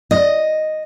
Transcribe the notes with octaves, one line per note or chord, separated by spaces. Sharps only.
D#5